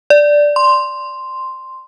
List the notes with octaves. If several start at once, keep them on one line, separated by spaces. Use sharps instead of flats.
D5
C6